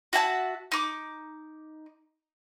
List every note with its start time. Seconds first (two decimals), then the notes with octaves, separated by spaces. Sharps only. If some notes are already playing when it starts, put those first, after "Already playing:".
0.13 F#4 E5 G#5 A5
0.72 D#4 D6